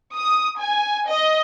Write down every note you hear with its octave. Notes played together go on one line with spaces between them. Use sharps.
D#6
G#5
D#5